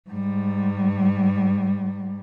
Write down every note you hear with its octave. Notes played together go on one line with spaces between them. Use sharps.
G#2 G3